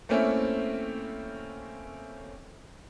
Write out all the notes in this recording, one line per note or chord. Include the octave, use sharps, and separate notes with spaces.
A3 A#3 C4 C#4 E4